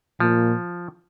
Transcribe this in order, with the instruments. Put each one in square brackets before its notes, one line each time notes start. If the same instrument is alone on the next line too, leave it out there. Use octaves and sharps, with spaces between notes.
[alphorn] A#2 [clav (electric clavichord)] F3